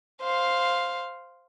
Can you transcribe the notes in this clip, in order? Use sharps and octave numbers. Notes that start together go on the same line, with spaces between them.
C5 F5